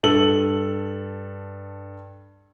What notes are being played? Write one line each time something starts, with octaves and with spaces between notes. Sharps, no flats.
G2 A4 F#7